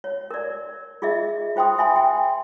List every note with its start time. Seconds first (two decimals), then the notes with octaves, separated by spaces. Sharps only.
0.04 C#5
0.31 A#4 D5
1.02 F4 G#4 D#5 E5
1.56 F4 C5 G5 C6 D#6
1.78 E5 G#5 B5 C6
1.96 G5